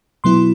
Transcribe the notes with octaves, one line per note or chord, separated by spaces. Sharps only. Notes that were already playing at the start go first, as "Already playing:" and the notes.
B2 F#3 B3 E4 C6